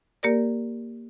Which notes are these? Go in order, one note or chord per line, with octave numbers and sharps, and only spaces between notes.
A#3 G4 A#4 D5